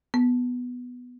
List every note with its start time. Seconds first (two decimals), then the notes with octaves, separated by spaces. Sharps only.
0.14 B3